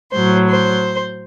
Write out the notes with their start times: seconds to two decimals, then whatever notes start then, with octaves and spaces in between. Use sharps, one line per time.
0.13 A2 F#3 C5
0.49 C5